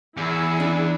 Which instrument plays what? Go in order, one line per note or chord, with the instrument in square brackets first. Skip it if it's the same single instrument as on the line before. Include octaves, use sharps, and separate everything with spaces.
[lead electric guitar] E2 [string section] E4 G#4 E6
[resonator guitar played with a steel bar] D4